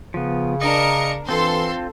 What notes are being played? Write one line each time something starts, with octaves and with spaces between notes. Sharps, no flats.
C#3 F3 B3
D4 A#4 D#5 C#7
E3 C4 F4 A4 C6